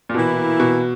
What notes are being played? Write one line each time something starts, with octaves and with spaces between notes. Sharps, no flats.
A#2
B2 E3 A#3 E4
B2